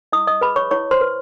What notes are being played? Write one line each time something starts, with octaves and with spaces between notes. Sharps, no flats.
E4 D#5 D#6
D#5 D#6
G#4 B4 B5
C#5 C#6
E4 C#5 C#6
C5 C6
B4